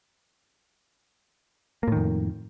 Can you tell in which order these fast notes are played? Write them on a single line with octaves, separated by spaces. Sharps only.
A#3 A2 D#3 F2